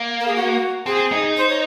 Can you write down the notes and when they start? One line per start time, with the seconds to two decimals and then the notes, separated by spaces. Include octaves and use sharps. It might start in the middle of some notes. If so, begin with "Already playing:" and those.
Already playing: A#3
0.20 A#4
0.27 G#4
0.35 F#4
0.86 C4 G#4
1.12 D#4
1.37 C5
1.49 C#5